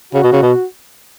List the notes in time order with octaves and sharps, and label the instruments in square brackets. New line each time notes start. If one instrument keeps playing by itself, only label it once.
[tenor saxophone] C#3 [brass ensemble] F#4
[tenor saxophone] B2
C#3
B2